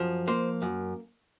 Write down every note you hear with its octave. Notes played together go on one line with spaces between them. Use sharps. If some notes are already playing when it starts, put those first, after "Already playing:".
Already playing: F#2 F3
A#3 C5
F#2